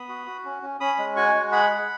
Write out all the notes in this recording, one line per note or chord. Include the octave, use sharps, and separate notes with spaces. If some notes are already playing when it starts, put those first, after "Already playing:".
Already playing: B3 B5 D#6
F#4
F#4
C#4
C#4
C#4 B5 D#6
G#3
F#4 G#5 C#6
G#3
G#4 F#5 B5
G#4